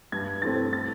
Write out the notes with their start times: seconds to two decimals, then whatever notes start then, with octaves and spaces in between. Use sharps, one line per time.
0.12 G2 G#6
0.42 E3 A3 C4 A6
0.73 A6